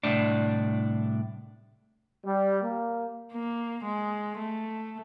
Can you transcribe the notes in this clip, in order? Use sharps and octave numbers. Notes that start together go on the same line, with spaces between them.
C2 A2 D4
G3
A#3
A#3
G#3
A3